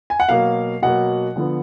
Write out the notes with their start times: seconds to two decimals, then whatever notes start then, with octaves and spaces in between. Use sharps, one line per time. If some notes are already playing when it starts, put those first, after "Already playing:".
0.10 G#5
0.20 F#5
0.29 B2 F#3 A#3 F5
0.82 B2 F#3 A#3 F#5
1.36 D3 F3 B3